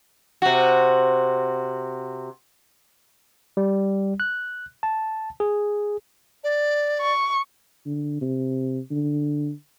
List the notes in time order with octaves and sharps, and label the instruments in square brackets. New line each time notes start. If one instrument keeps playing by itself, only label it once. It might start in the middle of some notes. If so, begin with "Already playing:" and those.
[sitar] C3 F#4
[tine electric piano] G3
F#6
A5
G#4
[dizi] D5
[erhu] C#6
[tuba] D3
C3
D3